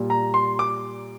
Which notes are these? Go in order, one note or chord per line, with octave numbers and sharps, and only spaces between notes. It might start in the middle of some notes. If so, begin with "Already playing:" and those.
Already playing: A#2 G3
A#5
C6
D6